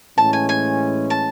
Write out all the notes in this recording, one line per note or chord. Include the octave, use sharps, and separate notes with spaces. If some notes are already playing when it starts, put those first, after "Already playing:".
A2 E3 G#3 C#4 A5
G#5
G#5
A5